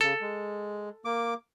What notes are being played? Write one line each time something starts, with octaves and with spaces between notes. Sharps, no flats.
C#3 A4
G#3
A#3 D6